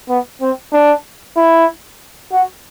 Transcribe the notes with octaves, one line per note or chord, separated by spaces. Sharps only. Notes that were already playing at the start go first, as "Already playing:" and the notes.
B3
C4
D4
E4
F#4